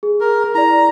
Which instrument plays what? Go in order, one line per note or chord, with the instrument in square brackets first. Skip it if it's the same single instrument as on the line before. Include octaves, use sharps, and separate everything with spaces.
[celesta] G#4
[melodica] A#4
[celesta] E4 D5 [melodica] A#5